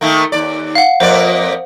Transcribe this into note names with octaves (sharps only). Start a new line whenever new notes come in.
D#3 A3 A#3
D#2 D5
F5 F#5
F2 A#3 C5 D5